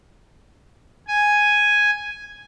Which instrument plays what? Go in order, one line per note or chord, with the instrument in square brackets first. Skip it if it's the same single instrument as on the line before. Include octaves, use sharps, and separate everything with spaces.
[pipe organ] G#5